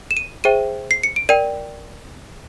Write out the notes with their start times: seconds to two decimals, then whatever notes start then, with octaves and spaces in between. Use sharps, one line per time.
0.11 E7
0.17 D#7
0.44 G#4 C5 E5 G5 D#7
0.91 C7
1.03 C#7
1.16 D7
1.29 A#4 D5 G5 D#7